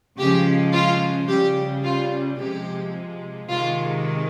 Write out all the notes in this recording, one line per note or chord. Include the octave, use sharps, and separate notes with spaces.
C#3 F3 G#3 G4
F4
C#3 G3 G4
F4
C3 F3 G#3 G4
C3 D#3 G#3 F4